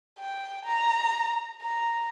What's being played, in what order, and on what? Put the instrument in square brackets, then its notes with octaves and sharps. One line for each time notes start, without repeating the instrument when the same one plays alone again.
[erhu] G5
A#5
A#5